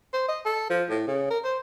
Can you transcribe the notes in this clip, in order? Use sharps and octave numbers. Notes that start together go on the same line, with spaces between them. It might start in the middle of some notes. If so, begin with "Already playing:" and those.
C5
D#5
A4
F3
A2
C#3
A#4
C5